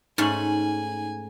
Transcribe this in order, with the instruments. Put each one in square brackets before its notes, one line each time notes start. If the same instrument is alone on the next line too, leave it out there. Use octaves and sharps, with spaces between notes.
[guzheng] G#2 A3 C#4 [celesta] D#4 F#7 [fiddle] G#5